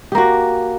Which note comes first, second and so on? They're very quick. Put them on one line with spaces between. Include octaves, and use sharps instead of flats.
G4 A#3 F#4